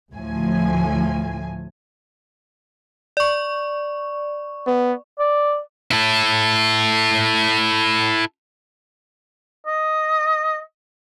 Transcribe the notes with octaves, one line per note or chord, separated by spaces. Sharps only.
D2 A2 F3 G#5
D5 C#6
B3
D5
E4 A4
D#5